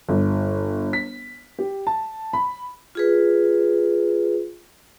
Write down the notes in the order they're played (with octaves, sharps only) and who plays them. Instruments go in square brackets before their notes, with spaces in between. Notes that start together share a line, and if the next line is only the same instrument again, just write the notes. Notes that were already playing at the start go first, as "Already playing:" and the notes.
[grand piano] G1
B6
G4
A5
B5
[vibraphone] F4 G#4 B4